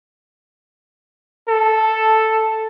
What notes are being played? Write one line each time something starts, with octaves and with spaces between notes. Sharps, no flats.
A4